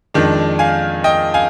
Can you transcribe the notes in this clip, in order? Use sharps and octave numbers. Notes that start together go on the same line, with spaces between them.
F2 D#3 G#3 D4
F5 G#5
D#5 G5
F5 G#5